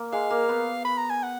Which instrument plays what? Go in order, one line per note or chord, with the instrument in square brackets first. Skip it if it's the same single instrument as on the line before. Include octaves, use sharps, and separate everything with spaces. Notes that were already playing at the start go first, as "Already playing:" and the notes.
Already playing: [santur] A#3
[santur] G#3 [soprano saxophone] F5
[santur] A#3
B3
[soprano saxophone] B5
A#5
G#5
F#5